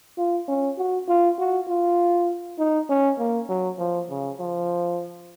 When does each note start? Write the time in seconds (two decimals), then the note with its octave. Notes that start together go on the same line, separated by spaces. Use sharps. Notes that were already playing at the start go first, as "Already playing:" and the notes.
0.18 F4
0.48 C#4
0.78 F#4
1.08 F4
1.39 F#4
1.68 F4
2.59 D#4
2.90 C#4
3.19 A#3
3.49 F#3
3.79 F3
4.10 C#3
4.40 F3